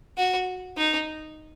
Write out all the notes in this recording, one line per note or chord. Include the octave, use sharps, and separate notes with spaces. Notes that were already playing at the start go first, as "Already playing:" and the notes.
F#4
D#4